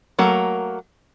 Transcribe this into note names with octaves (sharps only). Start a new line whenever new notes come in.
F#3 A3 A#3 A#4